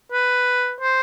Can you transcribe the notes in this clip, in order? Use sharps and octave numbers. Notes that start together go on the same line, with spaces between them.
B4
C5